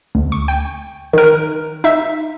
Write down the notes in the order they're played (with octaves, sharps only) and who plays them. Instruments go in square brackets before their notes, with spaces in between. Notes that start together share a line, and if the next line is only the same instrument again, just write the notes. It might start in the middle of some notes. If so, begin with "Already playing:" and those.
[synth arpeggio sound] D2
C#6
G5
D#3 A#4
D#4 E5